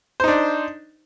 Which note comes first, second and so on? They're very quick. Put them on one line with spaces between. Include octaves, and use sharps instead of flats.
C5 D#4 D4